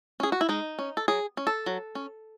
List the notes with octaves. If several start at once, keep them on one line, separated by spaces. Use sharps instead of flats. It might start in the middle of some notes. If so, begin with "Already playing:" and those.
C#4 G#4
F#4
E4
G#3 D#4
C#4
A4
F#3 G#4
C#4
A4
F#3
C#4